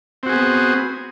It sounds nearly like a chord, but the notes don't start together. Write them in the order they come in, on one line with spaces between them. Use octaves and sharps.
C4 F#4 G#4 B3